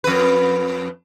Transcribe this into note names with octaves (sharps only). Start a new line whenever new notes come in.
F2 B4